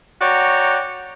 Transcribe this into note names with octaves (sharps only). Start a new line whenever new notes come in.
F#4 C#5 D5 G5 A#5